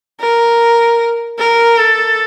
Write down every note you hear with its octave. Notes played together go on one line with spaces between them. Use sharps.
A#4
A#4
A4